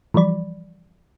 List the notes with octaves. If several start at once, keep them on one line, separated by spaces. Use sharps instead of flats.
E3 F3 G3 D5 B5